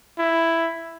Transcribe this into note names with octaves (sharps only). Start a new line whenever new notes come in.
E4